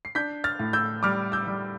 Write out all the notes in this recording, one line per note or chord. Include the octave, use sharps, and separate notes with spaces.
C7
D4 G6 B6
F6 A6
A2
E6 G6
G3 D6 F6
E6 G6
G3